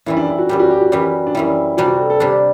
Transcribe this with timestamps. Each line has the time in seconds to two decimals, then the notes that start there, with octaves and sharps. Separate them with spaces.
0.06 F#2 E3 G3 E4
0.17 D4
0.28 E4
0.38 F#4
0.49 F#2 E3 G3 G4
0.59 F#4
0.70 G4
0.81 F#4
0.92 F#2 E3 G3 G4
1.02 F#4
1.27 D4
1.34 F#2 E3 G3 E4
1.77 C3 G3 D4 F#4
1.87 F#4
1.99 A4
2.10 A4
2.20 C3 G3 D4 G4